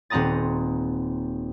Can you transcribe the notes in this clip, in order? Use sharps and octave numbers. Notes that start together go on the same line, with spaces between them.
D#1 C4 F#5 A#5 D#6 A6